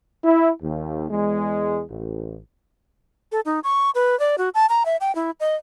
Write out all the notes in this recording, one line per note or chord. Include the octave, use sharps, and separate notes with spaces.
E4
D#2
E2 G#3
A1
A4
D#4
C#6
B4
D5
F#4
A5
A#5
E5
G5
E4
D#5